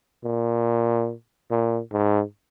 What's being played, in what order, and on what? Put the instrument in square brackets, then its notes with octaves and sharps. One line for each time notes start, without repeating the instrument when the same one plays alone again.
[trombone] A#2
A#2
G#2